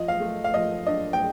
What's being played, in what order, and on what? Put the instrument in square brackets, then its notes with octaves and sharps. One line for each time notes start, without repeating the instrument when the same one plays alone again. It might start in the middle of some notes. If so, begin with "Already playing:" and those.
Already playing: [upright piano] F3 D#5
F5
A3
F5
F3 D#5
D4 D#5
G5